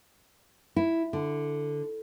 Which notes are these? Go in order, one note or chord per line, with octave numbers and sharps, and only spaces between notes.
E4
D3